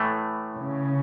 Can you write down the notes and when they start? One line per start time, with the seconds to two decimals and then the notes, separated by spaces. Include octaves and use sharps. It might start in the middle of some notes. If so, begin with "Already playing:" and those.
Already playing: A2 E3 A3
0.56 C#3